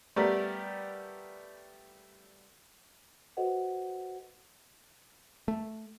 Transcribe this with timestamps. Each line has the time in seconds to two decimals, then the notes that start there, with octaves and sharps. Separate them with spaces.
0.16 G3 A3 B3 G4 A#4 D5
3.37 F#4 A4 B4 C5 D#5 F#5
5.48 A3